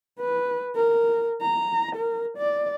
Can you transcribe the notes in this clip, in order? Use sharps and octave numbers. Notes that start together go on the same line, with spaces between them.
B4
A#4
A#5
A#4
D5